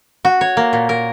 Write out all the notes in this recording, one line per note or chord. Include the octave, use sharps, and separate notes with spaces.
F#4
C#5
A#3
A#2
A#4